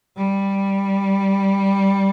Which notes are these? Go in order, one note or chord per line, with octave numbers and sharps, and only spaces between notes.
G3